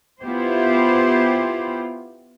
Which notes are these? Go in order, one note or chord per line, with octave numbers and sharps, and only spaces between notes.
B3 E4 F4 G4 C5